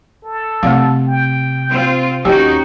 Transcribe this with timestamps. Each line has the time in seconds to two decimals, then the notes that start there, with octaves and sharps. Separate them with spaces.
0.24 A4
0.63 C3 A3 D5 F5
1.08 G5
1.70 C4 F4
2.25 D#2 C#4 D#4 F#4 G4 G5 G#5